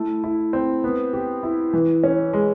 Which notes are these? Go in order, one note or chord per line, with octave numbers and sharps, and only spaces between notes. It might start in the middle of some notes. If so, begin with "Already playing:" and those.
Already playing: A3 E4
E4
C4
B3
G4
E4
E3
C#4
G#3